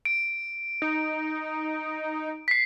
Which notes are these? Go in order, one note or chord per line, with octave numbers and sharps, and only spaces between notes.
D7
D#4
B6 C7